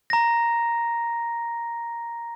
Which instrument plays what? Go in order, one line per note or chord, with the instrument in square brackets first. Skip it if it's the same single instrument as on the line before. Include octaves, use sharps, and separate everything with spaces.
[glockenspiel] A#5 A#6